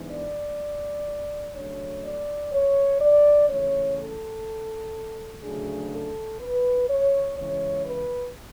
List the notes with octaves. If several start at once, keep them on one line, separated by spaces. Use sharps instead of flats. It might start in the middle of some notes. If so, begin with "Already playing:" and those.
Already playing: G#2 E3 B3 D4
D5
C#3 F#3 A3 D4 C#5
D5
C#5
D5
C#3 E3 A3 C#4 C#5
A4
D2 C#3 F#3 A3 D4 G#4
A4
B4
C#5
C#3 E3 G#3 C#4 C#5
B4